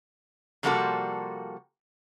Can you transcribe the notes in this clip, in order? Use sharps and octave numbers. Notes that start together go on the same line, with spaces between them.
C3 F3 G3 A#3 F#4 A4